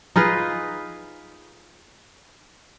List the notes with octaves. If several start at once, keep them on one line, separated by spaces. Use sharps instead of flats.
D#4 F4 G#4 B4